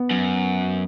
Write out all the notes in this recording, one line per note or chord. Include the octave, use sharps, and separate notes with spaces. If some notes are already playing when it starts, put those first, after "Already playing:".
Already playing: B3
F#2